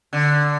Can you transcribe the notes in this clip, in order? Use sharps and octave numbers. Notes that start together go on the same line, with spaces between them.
D3